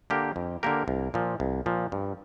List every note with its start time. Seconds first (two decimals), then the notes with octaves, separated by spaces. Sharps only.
0.10 D3 A#3 G4 A#4
0.36 F2
0.63 D3 A#3 G4 A#4
0.88 C2
1.14 A#2 F3
1.40 C2
1.66 A#2 F3
1.92 G2